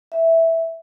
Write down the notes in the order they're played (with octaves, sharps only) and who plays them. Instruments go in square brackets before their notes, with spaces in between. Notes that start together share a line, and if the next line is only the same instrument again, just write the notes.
[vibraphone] E5